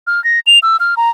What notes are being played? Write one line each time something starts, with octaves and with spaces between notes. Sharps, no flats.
F6
A#6
F7
E6
F6
A#5